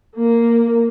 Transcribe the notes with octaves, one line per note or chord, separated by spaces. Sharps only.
A#3